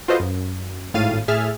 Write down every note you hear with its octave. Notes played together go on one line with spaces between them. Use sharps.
F4 F#4 A4 B4 C5 D#5
F#2
G#1 A2 F5 A6 D#7
A2 G#4 E5 F6 A6